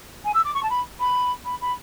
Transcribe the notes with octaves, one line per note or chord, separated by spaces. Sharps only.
G#5
E6
D6
C#6
A5
B5
B5
B5
B5